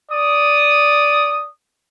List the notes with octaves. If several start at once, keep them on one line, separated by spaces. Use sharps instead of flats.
D5 D#6